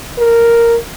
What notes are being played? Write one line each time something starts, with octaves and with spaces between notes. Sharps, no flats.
A#4